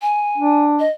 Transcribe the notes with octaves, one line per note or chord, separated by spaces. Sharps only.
G#5
D4
D#5